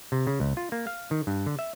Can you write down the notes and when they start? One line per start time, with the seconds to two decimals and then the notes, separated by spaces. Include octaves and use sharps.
0.12 C3
0.27 C#3
0.40 C#2
0.57 F4
0.72 A#3
0.87 F5
1.11 D#3
1.27 G2
1.46 D3
1.59 E5